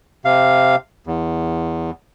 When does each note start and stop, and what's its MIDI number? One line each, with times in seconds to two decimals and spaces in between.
0.25 0.76 48
0.25 0.76 77
1.07 1.91 40